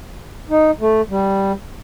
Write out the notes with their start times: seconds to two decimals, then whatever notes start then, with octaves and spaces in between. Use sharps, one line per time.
0.50 D#4
0.80 A3
1.10 G3